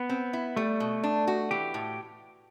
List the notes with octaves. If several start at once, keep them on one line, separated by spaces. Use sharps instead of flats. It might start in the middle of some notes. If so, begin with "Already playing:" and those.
Already playing: B3
C4
E4
G3 A3
B2
D4
F#4
E3 G4
A2